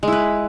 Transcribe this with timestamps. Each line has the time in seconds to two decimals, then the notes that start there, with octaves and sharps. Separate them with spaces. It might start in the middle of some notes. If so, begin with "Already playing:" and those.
0.03 G#3
0.08 E4
0.12 B4